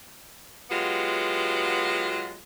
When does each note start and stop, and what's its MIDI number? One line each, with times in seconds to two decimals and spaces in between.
0.70 2.35 54
0.70 2.35 56
0.70 2.35 59
0.70 2.35 65
0.70 2.35 67